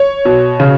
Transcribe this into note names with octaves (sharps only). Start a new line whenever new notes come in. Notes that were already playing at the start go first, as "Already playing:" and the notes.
Already playing: C#5
B2
C#3